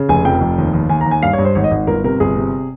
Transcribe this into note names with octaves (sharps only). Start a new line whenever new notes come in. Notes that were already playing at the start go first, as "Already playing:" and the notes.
Already playing: C#3
F1 G#5
F2 G5
F1
D#2
D#2
D#2 G#5
A#5
D#2
G#5
G2 F5
C#5
G2
C5
G#1 C#5
D#5
G#1
G1 A#4
C3 A#4
G1 G#4
C3